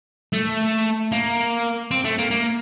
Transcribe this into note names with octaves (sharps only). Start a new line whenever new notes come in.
A3
A#3
C4
A3
A#3
A#3